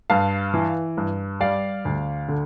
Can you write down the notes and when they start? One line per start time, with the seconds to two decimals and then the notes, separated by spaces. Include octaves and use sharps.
0.10 G2 F5 A5
0.54 E3
0.97 G2
1.40 G3 D5 F5
1.85 D2
2.28 D3